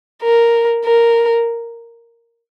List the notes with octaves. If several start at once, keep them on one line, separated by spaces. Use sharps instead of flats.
A#4
A#4